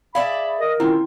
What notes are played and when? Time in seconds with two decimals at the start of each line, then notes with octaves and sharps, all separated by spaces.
0.15 G#4 D5 E5 F5 B5
0.59 A#4 D#5
0.80 D#3 C4 C#4 E4 F4 G5 C6